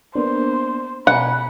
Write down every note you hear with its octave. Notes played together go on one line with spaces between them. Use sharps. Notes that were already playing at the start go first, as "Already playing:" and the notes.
A#3 B3 D4 C5
B2 F#5 G#5 A#5 B5